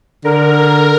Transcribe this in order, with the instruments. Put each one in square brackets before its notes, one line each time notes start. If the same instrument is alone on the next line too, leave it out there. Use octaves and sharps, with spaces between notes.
[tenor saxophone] D3 [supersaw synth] A#4